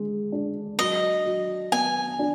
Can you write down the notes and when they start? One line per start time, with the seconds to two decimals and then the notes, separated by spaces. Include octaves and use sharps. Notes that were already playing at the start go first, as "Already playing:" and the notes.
Already playing: D3 G#3
0.32 D4
0.79 F#3 D#5
1.25 F#3
1.72 B3 G#5
2.19 D4